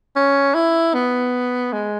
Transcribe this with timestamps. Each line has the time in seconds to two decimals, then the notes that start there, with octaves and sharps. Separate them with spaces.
0.16 C#4
0.54 E4
0.94 B3
1.73 G#3